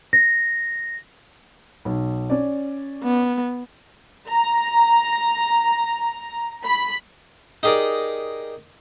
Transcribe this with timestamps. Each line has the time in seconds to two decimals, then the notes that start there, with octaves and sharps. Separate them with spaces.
0.13 A#6
1.85 B1
2.30 C#4 D5
3.04 B3
4.30 A#5
6.66 B5
7.63 D#4 G4 G#4 A#4 D5